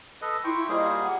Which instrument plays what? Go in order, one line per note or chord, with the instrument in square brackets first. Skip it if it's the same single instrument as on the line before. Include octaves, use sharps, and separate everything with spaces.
[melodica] A4 B4 D#5
[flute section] E4 F4 C6 [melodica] G5 C#6
[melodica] G3 A#3 G#4 [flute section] F4 C5 D#5
[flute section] F#5